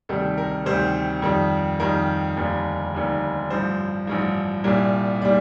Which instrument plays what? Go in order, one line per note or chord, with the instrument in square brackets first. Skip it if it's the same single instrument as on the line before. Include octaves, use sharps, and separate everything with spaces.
[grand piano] D2 C3 D#3 G3 A4
A#4
D2 C3 D#3 G3 C5
F2 D#3 G3
F2 D#3 G3 A#4
F1 D#2 D3 G3
F1 D#2 D3 G3
A1 G2 F3 C5
A1 G2 F3
C2 A#2 G3
A#2 G3 D5